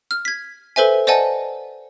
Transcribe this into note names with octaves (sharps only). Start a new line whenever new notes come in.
F6
G#6 B6
A4 B4 C5 E5 G#5
C5 D5 D#5 F#5 G#5 A5